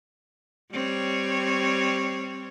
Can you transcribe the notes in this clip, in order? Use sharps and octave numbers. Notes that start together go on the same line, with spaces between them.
G3 C4 C#5